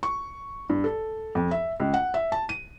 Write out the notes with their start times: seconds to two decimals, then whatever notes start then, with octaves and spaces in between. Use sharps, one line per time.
0.03 C#6
0.69 G2
0.84 A4
1.35 F2
1.51 E5
1.80 C#2
1.94 F#5
2.14 E5
2.32 A5
2.49 D#7